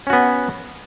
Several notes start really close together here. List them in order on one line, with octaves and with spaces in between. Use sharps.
C#4 F#4 B3